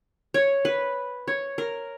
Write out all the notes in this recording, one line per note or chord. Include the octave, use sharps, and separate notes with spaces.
C#5
B4
C#5
A#4